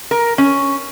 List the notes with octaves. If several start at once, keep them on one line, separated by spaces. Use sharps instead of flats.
A#4
C#4